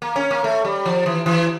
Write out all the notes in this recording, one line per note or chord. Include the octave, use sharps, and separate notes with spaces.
A#3
C#4
A#3
A3
G3
F3
E3
E3